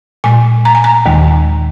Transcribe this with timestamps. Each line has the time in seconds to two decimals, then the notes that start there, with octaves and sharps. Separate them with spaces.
0.24 A#2 G#3 G#5
0.65 A#5
0.75 G#5
0.84 A#5
1.06 D#2 D#3 G#3